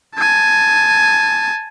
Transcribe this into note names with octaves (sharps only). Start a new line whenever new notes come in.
G#5 A5